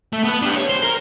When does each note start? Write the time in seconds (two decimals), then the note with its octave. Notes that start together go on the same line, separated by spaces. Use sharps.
0.13 A3
0.24 B3 B4
0.42 D4 G4
0.56 C#5
0.69 C5
0.83 A#4